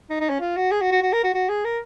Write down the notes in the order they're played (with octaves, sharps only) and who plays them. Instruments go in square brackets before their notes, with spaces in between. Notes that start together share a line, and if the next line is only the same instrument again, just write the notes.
[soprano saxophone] D#4
D#4
C#4
F4
F#4
G#4
F#4
F#4
F#4
A#4
F#4
F#4
G#4
A#4